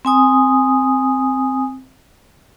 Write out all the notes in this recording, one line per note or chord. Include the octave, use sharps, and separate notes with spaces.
C4 G#5 D#6